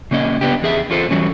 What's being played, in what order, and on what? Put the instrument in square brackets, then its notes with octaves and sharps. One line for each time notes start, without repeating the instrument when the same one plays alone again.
[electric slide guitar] C#3 A#3 C#4 D#5
B3 D4 G4
E2 G#4 E5
E2 F4 A4 C5
E3 F#3 G3 C#4